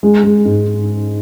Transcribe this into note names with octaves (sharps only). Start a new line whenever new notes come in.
G#3
G#3
G#2